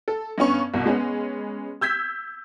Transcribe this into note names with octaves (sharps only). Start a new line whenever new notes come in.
A4
G2 B3 C#4 C#6
C2 B2
G#3 B3 C#4
E6 G6 G#6 B6